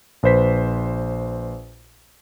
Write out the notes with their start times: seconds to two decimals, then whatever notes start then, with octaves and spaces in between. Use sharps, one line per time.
0.23 A#1 B4 C5 B6